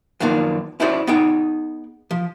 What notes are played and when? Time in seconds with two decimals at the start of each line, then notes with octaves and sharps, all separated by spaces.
0.20 F#2 D#3 F3 A#3 B3 D4
0.80 C#4 E4 F#4 C5 D5
1.07 B3 D#4 G#4 G5
2.11 F3